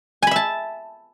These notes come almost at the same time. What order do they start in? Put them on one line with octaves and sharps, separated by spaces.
G#5 B5 E5 A5